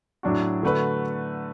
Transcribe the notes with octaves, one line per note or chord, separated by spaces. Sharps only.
A2 F#3 D4 F#4
D3 A3 F#4 B4